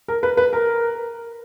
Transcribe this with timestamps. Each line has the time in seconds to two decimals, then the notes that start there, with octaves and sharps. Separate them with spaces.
0.08 A#4
0.23 B4
0.37 B4
0.53 A#4